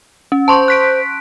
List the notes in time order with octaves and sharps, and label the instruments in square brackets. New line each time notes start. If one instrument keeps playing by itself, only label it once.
[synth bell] C#4
[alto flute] C5 [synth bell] A5 C6 C#6
[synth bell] F#6 B6 D7